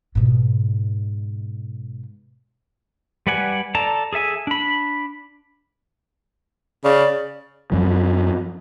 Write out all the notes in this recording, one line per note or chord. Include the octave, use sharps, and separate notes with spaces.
G#2 B2
G3 B4 D5 F#5 G#5
A4 D5 A5 A#5
G#4 A4 E5 G#5
D4 B5
C#3 D5
F#2 F3